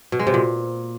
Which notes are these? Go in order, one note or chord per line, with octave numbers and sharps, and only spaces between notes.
B2
G#3
C3
A#2